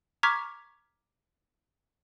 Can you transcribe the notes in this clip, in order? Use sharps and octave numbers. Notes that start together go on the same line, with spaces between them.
A#5 C#6 D6 F6 G#6 B6